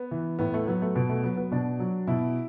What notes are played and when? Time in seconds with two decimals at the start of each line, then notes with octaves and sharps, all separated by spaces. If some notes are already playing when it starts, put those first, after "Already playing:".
Already playing: B3
0.11 E3
0.39 A2 B3
0.54 A3
0.67 F#3 B3
0.82 A3
0.95 B2 B3
1.10 A3
1.23 F#3 B3
1.37 B3
1.52 B2 D4
1.80 F#3
2.07 B2 E4